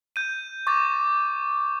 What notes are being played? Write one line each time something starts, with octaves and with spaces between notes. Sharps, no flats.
G6 D#7
C#6 D6 A6